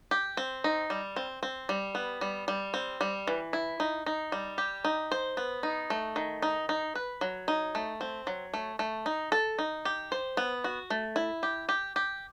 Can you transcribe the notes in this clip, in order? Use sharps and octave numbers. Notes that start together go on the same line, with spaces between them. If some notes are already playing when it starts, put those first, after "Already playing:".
G4
C4
D#4
G3
C4
C4
G3
B3
G3
G3
C4
G3
E3
E4
D#4
D#4
G3
G4
D#4
C5
B3
D#4
A3
D#3
D#4
D#4
B4
F#3
D#4
A3
C4
F#3
A3
A3
D#4
A4
D#4
G4
C5
B3
F#4
A3
E4
G4
G4
G4